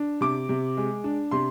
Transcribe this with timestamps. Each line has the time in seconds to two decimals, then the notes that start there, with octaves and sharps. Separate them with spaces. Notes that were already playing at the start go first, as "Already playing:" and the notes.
Already playing: D4
0.21 C3 D6
0.49 C3
0.77 G#3
1.04 D4
1.31 C3 C6